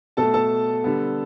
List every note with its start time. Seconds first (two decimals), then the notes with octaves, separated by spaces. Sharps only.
0.17 B2 A3 A4 A5
0.34 A4 A5
0.84 D3 G3 B3